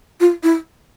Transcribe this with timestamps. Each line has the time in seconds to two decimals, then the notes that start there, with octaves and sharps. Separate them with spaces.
0.20 F4
0.43 E4